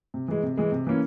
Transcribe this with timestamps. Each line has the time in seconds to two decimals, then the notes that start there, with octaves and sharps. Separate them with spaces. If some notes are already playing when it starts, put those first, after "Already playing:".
0.14 C3
0.28 E3 G#3
0.43 C3
0.57 E3 G#3
0.72 C3
0.87 E3 A#3 C#4 E4